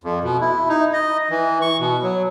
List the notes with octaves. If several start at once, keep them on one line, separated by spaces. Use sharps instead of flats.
F2
B2
E4
D#4
D#5
E3
C#6
B2
F#3